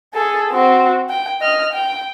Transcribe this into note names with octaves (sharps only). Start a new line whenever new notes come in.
G#4 A4
C4 F#4
G5
D#5 F6
G5